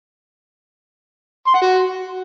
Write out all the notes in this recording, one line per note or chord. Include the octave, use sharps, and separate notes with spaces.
C6
F#5
F#4